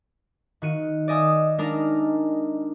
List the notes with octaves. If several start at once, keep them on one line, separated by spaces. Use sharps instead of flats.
D#3 F#4 D#7
D5 D#5 G#5 D#6 E6
G#3 D4 D#4 A#4 A#5